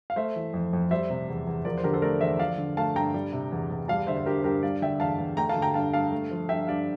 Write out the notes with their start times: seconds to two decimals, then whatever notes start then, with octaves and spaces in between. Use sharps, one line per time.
0.10 F5
0.16 A3 C5 E5
0.36 E3
0.53 F2
0.73 F2
0.91 G3 C5 E5
1.10 C3
1.29 E2
1.47 E2
1.65 F3 A#4 D5
1.78 C5
1.83 D3 G4 A#4
1.93 A4 C5
2.02 A3 A#4 D5
2.21 E2 C5 E5
2.39 F3 D5 F5
2.58 D3
2.77 A3 F5 A5
2.95 G2 G5 A#5
3.14 G3
3.33 C3
3.52 E2
3.71 E2
3.88 G3 F5 A5
4.07 D3 C5 E5
4.17 C5
4.26 G2 G4 A#4
4.40 C5
4.44 G2 G4 A#4
4.63 G3 D5 F5
4.82 D3 E5 G5
5.00 E2 F5 A5
5.18 E2
5.37 A3 G5 A#5
5.49 F5 A5
5.56 D3
5.62 G5 A#5
5.74 G2 F5 A5
5.93 G2 F5 A5
6.12 A3
6.31 F3
6.49 G2 E5 G5
6.67 G2 D5 F5